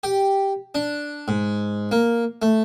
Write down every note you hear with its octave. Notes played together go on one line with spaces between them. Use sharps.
G4
D4
G#2
A#3
A3